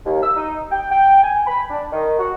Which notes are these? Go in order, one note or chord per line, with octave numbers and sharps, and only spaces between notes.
D#2
E6
D#4
G5
G5
G#5
B5
D4
D#3
F#4